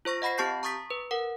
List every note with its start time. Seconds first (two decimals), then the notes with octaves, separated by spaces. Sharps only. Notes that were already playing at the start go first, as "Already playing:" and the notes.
0.05 F4 C5 C#6 A#6
0.22 D#5 F#5 B5 A#6 C7
0.38 C4 G4 A5 C#6 G6 C7
0.63 A#5 C#6 D#6 A6 B6
0.90 B4
1.11 A#4 F#5